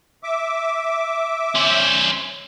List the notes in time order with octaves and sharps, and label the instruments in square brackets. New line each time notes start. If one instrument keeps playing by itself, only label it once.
[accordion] E5 D6
[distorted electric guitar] C#4 C5